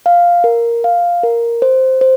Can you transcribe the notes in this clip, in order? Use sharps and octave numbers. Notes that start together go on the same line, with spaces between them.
F5
A#4
F5
A#4
C5
C5